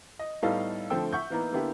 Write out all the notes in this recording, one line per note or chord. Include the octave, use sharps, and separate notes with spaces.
D#5
A2 G3 B3 D#4 A4 F5
D3 F3 A3 C4 G5 E6
E5 F#5 C#6 G6
E3 A#3 B3 D#4 A#4
D3 A#3 B3 E4 G4